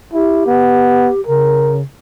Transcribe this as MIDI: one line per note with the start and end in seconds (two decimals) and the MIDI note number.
0.14 0.43 64
0.14 1.20 67
0.47 1.11 59
1.27 1.82 49
1.27 1.79 70